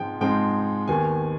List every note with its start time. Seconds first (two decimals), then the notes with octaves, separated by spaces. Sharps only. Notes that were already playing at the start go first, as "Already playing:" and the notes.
Already playing: G#2 F3 G#3 C4 D#4 G5
0.20 G#2 F3 G#3 C4 D#4 G5
0.88 D#2 D#3 G#3 B3 G#5